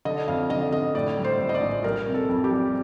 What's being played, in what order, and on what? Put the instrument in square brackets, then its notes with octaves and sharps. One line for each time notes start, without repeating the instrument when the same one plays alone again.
[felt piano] D3 D#5
F2 F5
D3 D#5
D3 D#5
A2 D5
G3
C5
A2
D#5
D5
A#1
G3 A#4
C3
A4
F2
G4
G3